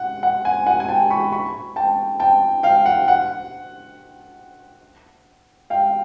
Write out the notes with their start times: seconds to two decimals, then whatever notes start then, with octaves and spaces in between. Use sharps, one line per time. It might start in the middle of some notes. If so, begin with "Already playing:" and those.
Already playing: F#5
0.23 F#5
0.45 F#5 G#5
0.67 F#5 G#5
0.80 G#5
0.89 G5 A5
1.10 B5 C#6
1.32 B5 C#6
1.76 G5 A5
2.20 G5 A5
2.63 F5 G5
2.86 F#5
3.08 F#5
5.70 F5 G5